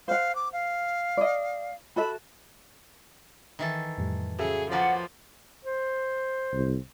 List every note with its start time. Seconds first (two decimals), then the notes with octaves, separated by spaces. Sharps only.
0.08 C5 F5 F#5
0.35 D6
0.53 F5
1.17 D5 D#5
1.96 F#4 A4 E5 B5
3.59 D#3 E3 A4
3.98 F2 A2 G3
4.39 C#3 F#3 F#4 G#4 A4 E5
4.72 F3 A#3 B4 C5 D5 F#5 G#5
5.65 C5
6.54 C2